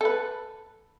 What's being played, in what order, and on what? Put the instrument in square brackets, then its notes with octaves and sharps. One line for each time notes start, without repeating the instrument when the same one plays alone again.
[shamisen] A4 B4